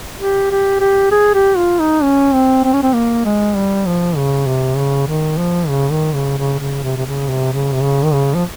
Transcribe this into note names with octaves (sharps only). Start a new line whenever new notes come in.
G4
G4
G4
G#4
G4
F4
D#4
C#4
C4
C4
C#4
C4
A#3
G#3
G3
F3
C#3
C3
C#3
D#3
F3
C#3
D#3
C#3
C#3
C#3
C3
C3
C#3
C3
C#3
C3
C#3
D#3
C#3
F3